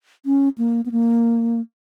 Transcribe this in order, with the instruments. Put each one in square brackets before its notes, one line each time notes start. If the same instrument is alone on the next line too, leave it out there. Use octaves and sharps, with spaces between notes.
[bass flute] C#4
A#3
B3
A#3